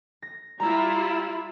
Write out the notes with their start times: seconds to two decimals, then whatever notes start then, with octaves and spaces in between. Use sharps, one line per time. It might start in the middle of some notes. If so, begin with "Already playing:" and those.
0.22 A#6
0.60 G3 E4 F4 A#5